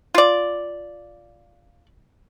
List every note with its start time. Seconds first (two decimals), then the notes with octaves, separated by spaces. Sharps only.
0.14 F4 D5